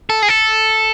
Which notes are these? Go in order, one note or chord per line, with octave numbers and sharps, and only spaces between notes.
A4
G#4
A4